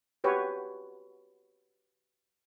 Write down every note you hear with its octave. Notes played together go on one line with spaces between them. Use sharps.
F#4 G4 B4 C#5